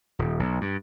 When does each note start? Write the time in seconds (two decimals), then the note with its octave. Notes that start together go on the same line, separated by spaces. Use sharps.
0.19 D#1
0.40 B1
0.61 G2